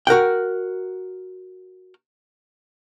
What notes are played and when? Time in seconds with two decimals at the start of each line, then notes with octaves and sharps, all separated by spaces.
0.07 F#4 A#4 F#5 G5